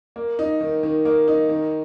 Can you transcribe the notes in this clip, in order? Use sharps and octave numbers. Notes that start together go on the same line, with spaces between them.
A#3
D#4
D#3
D#3
A#3
D#4
D#3